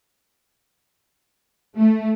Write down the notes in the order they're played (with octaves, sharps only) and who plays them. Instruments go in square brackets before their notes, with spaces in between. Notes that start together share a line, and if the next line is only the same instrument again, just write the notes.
[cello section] A3